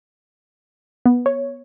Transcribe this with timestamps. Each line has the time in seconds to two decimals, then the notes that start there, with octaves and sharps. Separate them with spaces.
1.06 B3
1.26 C#5